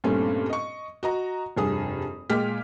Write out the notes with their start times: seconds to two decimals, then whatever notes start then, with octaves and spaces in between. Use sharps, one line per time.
0.04 G2 A#2 A3 C4 C#4
0.50 D#5 C#6
1.03 F#4 D#5 A#5
1.57 F1 G2 G#4 D#6
2.30 A#2 G#3 G5 D6 F6 B6